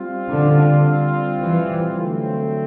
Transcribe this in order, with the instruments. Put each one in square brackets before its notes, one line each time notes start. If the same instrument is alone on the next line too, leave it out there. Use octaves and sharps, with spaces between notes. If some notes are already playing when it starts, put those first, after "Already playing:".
Already playing: [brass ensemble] G3 C4 F4
[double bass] D3
E3
[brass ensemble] D3 F#3 A3 C4